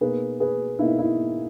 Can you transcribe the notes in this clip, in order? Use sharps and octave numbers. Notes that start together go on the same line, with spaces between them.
B2 A#3 D#4 G#4 B4
G#4 B4
B2 A#3 D#4 E4
E4